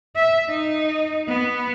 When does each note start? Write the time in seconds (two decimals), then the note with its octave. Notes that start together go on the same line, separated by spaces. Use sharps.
0.16 E5
0.50 D#4
1.28 B3